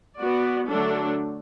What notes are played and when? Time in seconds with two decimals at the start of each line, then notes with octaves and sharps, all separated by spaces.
0.17 B3 F#4 D5
0.68 D3 F#3 A3 D4 A4